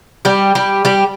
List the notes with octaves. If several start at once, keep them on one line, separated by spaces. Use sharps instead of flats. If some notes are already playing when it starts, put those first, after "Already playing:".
G3 G4
G3 G4
G3 G4